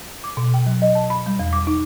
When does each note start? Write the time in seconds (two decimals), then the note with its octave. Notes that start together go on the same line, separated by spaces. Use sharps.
0.24 D6
0.37 B2
0.54 G5
0.66 F#3
0.82 D#5
0.95 A5
1.10 B5
1.26 G3
1.39 E2
1.53 D6
1.67 D#4